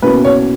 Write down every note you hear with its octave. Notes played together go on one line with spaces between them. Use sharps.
B2 A#3 C#4 E4 B4
C#5